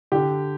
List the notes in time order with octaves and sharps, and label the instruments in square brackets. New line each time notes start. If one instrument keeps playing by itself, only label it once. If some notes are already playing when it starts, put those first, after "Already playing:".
[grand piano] D3 G4